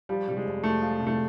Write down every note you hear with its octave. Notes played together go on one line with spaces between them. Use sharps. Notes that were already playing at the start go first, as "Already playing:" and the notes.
F3 G3
C3 G3
G#3
F1
F2 A3
F3
C3
A3